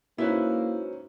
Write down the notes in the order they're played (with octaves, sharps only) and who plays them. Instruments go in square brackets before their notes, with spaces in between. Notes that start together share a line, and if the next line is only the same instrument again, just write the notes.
[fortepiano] G#2 C#4 F#6 [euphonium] A#3 [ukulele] E4 [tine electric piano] F#4 B4 C5